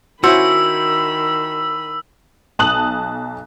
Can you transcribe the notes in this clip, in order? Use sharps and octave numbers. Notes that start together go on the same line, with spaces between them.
D#3 C#4 E4 F#4 C5 B5 E6
B1 A5 D#6 F#6 F#7